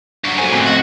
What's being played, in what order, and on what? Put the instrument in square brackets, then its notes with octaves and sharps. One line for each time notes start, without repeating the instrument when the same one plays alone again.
[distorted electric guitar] G2 F#3 [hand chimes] F#5 C#6
[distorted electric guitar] F#2 A#2 [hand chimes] F#4 A4 C5 [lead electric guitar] G#5
[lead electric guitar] A2 C4 [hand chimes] F#4 F#6 G#6
[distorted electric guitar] F#4 [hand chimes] D#5 F5 G#6